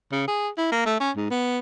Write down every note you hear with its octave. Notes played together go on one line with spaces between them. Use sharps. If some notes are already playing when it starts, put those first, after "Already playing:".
C#3
G#4
E4
A#3
A3
C#4
G#2
B3